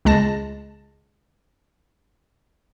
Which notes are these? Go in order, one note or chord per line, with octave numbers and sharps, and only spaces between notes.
C#2 G#3 A5 A#6